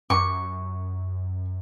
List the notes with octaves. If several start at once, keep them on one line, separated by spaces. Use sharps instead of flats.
F#2 C#6